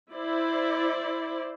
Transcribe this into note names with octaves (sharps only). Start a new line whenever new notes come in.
E4 C5 D5